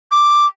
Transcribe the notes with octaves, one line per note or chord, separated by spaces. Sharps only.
D6